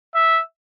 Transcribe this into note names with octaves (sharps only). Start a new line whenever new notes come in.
E5